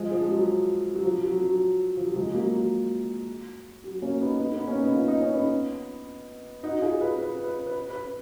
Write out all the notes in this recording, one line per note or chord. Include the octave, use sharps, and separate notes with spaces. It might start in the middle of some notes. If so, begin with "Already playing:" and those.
Already playing: F3 G#3
F3 G#3
F#3
F#3
F3
F#3
F#3
F3
F#3
F3 G#3
F#3 A#3
F#3
F#3
A#3 C#4
B3 D#4
B3 D#4
B3 D#4
A#3 C#4
B3 D#4
F4
D#4
C#4
B3 D#4
D#4 F#4
F4 G#4
G#4 B4
B4
B4
B4
B4